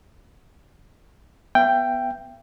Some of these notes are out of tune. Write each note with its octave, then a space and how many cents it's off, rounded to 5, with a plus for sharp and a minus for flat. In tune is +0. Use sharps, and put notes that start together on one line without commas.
B3 +0 E5 +40 G5 +0